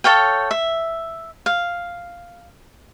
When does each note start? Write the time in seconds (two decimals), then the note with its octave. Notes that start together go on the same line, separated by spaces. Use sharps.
0.04 A4 C#5 F5 G5
0.51 E5
1.46 F5